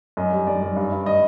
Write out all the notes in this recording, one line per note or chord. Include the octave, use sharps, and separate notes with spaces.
F#2 D#5
G3
F#2 D5
F#2
G2
G2
D#5